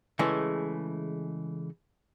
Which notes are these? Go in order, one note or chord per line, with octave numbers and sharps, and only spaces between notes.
C#3 E3 G#3 A3